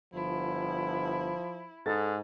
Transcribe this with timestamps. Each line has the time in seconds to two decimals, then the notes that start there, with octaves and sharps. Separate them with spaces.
0.14 G1 F3 E4
1.86 G#2 A4 A6